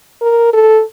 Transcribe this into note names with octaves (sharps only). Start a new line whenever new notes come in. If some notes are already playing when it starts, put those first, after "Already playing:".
A#4
A4